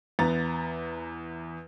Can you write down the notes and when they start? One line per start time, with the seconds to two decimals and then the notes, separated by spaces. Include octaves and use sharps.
0.19 E2 B3 A#5 A6